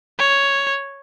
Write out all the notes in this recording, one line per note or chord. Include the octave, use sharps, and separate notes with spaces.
C#5